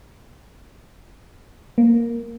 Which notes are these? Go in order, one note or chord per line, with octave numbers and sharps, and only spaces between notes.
A#3